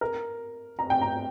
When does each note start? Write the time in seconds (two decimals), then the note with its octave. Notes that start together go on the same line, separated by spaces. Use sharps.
0.01 A#4
0.79 A#5
0.90 G5
1.01 A#5